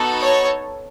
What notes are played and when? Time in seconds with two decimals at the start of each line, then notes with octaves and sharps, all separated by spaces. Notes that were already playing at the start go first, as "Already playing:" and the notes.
Already playing: B3 D#4 F#4 A4
0.21 C#5